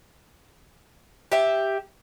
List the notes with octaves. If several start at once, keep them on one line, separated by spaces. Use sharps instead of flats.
G4 E5